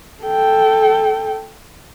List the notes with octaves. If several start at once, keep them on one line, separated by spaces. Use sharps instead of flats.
A4 G5